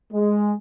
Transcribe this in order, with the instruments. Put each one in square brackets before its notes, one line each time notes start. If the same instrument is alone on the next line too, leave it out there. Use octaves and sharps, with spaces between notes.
[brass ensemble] G#3